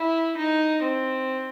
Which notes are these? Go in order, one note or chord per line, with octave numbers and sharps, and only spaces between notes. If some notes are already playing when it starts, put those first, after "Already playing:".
Already playing: E4
D#4
C4